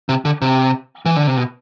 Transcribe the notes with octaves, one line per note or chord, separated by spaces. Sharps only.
C3
D3
C3
E3
D3
C3
B2